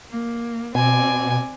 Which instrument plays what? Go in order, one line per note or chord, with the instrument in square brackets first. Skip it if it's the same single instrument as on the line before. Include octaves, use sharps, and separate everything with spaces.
[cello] A#3
[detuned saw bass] B2 [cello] C4 D5 [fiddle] G#5